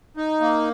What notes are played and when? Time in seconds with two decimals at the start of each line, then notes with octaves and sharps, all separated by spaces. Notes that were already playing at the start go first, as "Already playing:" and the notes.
0.17 D#4
0.41 A#3